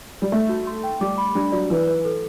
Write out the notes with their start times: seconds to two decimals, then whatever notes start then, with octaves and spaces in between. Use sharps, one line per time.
0.22 G3
0.32 A3 E5
0.49 F#4
0.67 C6
0.84 G5
1.01 G3 D6
1.18 B5
1.35 G3 D4
1.52 F#3 D5
1.70 E3 B4
1.88 B4
2.05 A4